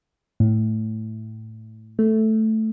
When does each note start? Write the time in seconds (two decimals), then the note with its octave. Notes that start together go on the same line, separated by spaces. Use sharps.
0.40 A2
1.99 A3